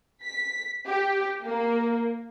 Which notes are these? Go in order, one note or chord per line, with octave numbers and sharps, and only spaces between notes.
B6
G4
A#3